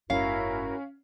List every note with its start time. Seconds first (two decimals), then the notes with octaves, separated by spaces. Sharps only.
0.10 F#1 G#2 C#4 E4 F#4 A#4 F5